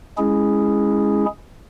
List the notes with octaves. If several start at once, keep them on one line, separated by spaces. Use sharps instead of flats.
G#3 C#4 E4 G#4